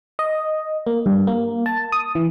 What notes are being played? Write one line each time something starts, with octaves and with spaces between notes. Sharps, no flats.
D#5
A#3
G2
A#3
A5
D#6
E3